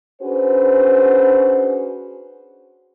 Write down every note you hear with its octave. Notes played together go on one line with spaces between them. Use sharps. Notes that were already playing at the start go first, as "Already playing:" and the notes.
C#4 D4 F#4 G#4 B4 C5